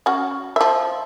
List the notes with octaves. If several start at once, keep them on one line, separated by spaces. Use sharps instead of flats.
C#4 F#4
F3 E5